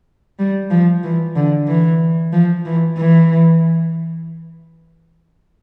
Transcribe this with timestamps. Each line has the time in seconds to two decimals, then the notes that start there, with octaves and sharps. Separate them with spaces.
0.39 G3
0.71 F3
1.04 E3
1.36 D3
1.68 E3
2.33 F3
2.66 E3
2.98 E3